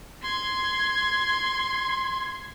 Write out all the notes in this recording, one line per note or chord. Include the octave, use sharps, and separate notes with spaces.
C6 G#6